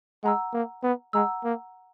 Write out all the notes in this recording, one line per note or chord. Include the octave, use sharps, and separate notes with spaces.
G#3 F#5 A#5 E6
A#3
B3
G#3 F#5 A#5 E6
A#3